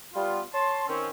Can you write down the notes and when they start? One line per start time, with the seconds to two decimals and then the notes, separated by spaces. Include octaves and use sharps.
0.14 G3 B3 F4
0.52 C#5 A5 C6
0.87 D#3 C4 C#4